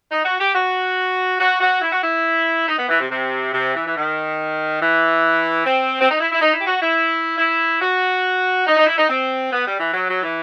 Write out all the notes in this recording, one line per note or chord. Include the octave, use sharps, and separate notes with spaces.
D#4
F#4
G4
F#4
F#4
F#4
E4
F#4
E4
D#4
B3
E3
C3
C3
C3
E3
E3
D#3
E3
C4
C4
D#4
E4
E4
D#4
E4
G4
F#4
E4
E4
F#4
D#4
D#4
E4
D#4
C4
B3
G3
E3
F#3
F#3
E3